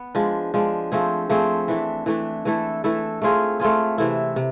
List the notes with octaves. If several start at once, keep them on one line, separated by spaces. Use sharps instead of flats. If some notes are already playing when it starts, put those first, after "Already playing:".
Already playing: B3
F3 G#3 D4
F3 G#3 D4
F3 A3 C4 G#4
F3 A3 C4 G#4
E3 A3 D4
E3 A3 D4
E3 A3 E4 A4
E3 A3 E4 A4
A3 C4 F4 G#4
A3 C4 F4 G#4
C3 E3 A3 E4
C3